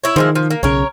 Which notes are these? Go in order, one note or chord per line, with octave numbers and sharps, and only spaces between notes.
E4 C#5
D#3 F3 G#3 E4
F3
A#3
B1 C#3 A#4 C#5